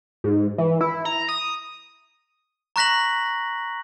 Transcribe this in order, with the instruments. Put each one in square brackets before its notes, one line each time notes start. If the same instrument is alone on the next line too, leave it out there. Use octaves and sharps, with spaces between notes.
[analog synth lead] G#2
E3
E4
A#5
D#6
[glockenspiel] A#5 C#6 F#6 A#6 B6 F#7